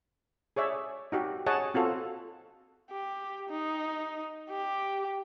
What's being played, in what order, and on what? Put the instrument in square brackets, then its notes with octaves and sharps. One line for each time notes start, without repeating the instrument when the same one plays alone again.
[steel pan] G#4 C#5 D5 E5
D#4 F#4 G4
G#4 C#5 D#5 F#5 G#5 A5
C4 F4 F#4 A4
[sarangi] G4
D#4
G4